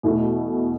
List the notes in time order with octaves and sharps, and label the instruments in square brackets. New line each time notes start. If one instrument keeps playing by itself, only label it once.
[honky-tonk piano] E2 B2 A3 E4